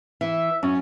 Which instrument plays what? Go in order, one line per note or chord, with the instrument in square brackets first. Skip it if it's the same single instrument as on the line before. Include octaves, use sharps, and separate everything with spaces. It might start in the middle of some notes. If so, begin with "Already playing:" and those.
[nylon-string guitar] E3 [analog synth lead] E5
[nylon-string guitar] F#2 [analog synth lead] C#4